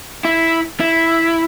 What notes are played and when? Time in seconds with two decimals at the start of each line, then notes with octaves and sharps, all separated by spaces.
0.25 E4
0.80 E4